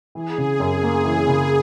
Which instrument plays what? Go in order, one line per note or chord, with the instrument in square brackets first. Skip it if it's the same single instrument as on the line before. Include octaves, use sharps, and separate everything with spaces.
[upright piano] E3 [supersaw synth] G#4
[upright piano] C#3
[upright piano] F#2 [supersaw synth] G#4
[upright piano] A#3
E3
C#3